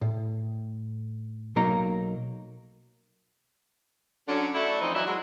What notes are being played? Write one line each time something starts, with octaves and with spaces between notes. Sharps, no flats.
A2
B1 F#3 A#3 D#4 A#5
D3 F#3 C#4
A3 E4 F#4 A4 D5 E5
E3 F3 C4 D#4
E3 F#3 D4 E4
F#3 G#3